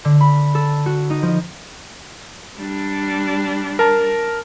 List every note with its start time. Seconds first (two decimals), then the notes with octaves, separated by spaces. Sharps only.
0.05 D3
0.21 B5
0.55 A4
0.86 F#4
1.10 D#4
1.22 F3
2.58 G3 D4
3.79 A#4 A5